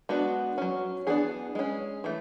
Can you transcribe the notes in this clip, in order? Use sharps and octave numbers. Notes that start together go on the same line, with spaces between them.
G#3 B3 D4 F#4
F#3 C#4
E3 B3 D4 G#4
G#3 C#4
E3 A3